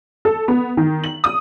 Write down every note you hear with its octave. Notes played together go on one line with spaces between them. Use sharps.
A4
B3
D#3
F#7
D#6